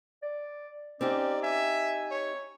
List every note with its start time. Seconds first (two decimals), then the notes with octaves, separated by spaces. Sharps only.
0.23 D5
1.01 C4 C#4 D#4 G4 D5
1.43 E5 G#5
2.11 C#5